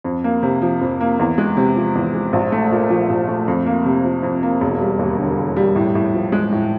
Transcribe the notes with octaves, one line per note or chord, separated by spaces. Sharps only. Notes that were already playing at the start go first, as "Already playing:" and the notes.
F2
A#3
C3
F3
F2
A#3
E2
G#3
C3
F3
E2
G#3
A#1
A3
A#2
F3
A#1
A3
F2
A#3
C3
F3
F2
A#3
E1
G3
D#2
D3
E1
G3
A2
A2
F3
G#3
A2